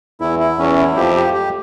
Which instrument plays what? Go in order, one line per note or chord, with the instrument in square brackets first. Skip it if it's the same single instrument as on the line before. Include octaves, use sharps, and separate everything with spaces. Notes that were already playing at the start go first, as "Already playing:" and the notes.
[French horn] E2 [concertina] E4
[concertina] E4
[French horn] E2 [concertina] C#4
[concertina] E4
[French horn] F2 [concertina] G4
[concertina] G4
G4